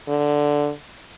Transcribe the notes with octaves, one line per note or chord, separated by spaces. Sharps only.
D3